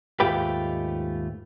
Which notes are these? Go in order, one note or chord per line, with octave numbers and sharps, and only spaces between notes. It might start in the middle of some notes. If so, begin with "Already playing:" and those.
D#2 G#2 A3 F4 G4 B4